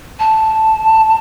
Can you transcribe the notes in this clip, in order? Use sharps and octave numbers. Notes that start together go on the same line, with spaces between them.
A5